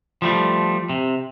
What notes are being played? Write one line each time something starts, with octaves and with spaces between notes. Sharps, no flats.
F3 G3 A3
C3